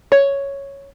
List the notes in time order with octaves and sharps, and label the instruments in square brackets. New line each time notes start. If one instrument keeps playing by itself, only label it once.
[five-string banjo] C#5